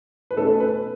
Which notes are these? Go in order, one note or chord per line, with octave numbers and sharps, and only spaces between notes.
B4
B2 A3 C#4 A4
B4